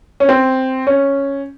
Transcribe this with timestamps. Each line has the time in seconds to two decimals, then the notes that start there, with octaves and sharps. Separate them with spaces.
0.20 C#4
0.29 C4
0.87 C#4